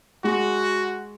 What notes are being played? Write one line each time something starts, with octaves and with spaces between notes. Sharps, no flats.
G#3 F#4